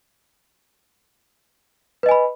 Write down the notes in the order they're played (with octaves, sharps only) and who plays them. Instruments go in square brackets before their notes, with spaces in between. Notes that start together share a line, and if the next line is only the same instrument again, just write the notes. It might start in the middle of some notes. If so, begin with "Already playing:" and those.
[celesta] B4
D#5
G#5
B5